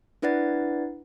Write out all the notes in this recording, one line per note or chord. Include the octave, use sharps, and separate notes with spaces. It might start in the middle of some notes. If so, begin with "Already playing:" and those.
D4 E4 B4 D5 F#5 A6